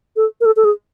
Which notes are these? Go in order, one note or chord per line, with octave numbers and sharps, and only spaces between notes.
A4
A#4
A4
A4
G#4